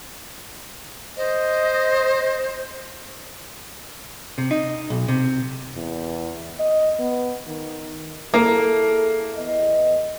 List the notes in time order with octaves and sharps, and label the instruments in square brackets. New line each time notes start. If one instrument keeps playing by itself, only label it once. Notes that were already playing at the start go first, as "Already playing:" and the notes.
[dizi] C5 [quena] D#5
[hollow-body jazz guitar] C3
D#4
B1
C3
[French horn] E2
D#5
B3
D#3
[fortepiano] A#3 [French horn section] E4 G#4 A4
[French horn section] E2 D#5